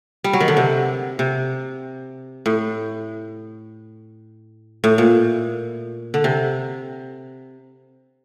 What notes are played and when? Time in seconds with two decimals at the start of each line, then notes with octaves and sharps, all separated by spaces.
0.24 G3
0.33 F#3
0.40 D#3
0.48 D3
0.57 C3
1.19 C3
2.46 A2
4.84 A2
4.98 A#2
6.14 D3
6.24 C3